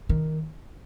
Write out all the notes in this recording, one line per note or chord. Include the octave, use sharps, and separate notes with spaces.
D#3